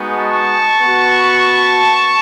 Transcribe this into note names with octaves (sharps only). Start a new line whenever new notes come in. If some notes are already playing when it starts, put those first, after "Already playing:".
Already playing: G#3 B3 D#4 F#4
A5 C#6
B3 F#4